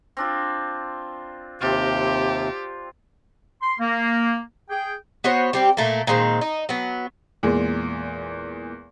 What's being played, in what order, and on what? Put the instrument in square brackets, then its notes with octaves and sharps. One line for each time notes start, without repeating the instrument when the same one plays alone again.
[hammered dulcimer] C4 D4 F4
[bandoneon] D#2 C3 [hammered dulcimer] C4 F4 [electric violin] G4
[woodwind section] C6
A#3
G#4 G5
[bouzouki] B3 F#4 C5 C#5
G3 C4 G4
A#2 A3 A#3
A#2 D#3 G#3 C4
D#4
F#3 B3
[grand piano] E2 A#2 G#3